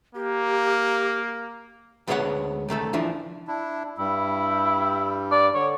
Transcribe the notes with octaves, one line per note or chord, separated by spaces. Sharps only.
A#3 G4
D2 G#3 B3 A4 C#5 F#5
C2 D#3 A3 A4
E3 F3 D4 E4
D4 E4
G2 G3 E4
D5
D3 C#5